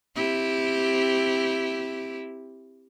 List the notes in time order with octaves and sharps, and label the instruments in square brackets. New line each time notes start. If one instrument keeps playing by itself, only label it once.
[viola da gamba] C4 E4 G4